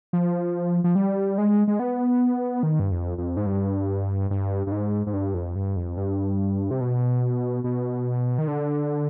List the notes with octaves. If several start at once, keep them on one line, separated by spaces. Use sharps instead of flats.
F3
F3
G3
G#3
G#3
B3
D#3
G2
F2
F2
G#2
G2
G2
G2
G#2
G#2
G2
F2
G2
F2
G2
C3
B2
B2
D#3
D3